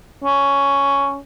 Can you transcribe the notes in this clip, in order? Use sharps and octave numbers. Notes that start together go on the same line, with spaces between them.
C#4